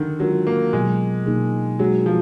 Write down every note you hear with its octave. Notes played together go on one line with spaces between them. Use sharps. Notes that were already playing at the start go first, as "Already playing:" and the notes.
Already playing: D3 D#3
F#3 G#3 D4 F4 A#4
A#3
B2 F#3 G#3 B3
B2 A#3 D#4 G#4
F#3 G#3 D4 G#4
F3